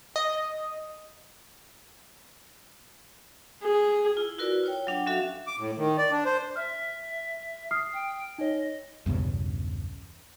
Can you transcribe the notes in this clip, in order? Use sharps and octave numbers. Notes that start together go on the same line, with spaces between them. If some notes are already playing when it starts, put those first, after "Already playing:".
D#5
G#4
E4 F4
E4 F#4 A#4 B4 D5
F4 C#5 G5
F#3 D4 G5
F#3 C#4 F#4 A4 E5 F5
D6
A2
D#3
D5
D4
C5
E5 F6
D#6 F6 C7
G5
D#4 C#5 D#5
B1 E2 G2 C#3